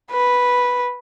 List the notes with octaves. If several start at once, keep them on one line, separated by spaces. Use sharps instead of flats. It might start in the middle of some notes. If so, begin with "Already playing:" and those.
B4